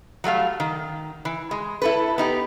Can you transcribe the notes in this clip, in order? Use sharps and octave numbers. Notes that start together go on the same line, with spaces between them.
F#3 G3 A3 F5
D#3
E3
G#3
E4 A4 B4
B3 D#4 G4